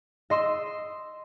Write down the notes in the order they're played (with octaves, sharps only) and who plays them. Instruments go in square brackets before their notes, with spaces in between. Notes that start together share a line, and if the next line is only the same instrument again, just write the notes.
[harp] D#5 C6 E6